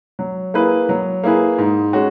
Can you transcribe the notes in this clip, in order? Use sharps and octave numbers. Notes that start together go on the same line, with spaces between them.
F#3
A#3 E4 G#4 B4
F#3
A#3 E4 G#4 B4
G#2
G#3 C#4 F#4